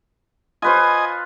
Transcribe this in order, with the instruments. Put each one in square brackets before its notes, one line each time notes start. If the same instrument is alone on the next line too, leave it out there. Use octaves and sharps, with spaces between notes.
[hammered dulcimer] F4 B4 C5 [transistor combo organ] D#5 G#5